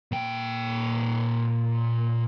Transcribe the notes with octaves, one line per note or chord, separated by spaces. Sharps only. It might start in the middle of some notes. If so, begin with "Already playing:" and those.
A#2 G5